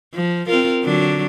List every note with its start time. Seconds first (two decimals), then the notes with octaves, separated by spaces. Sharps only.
0.14 F3
0.47 C4 F4 A#4
0.83 D3 F#3 D4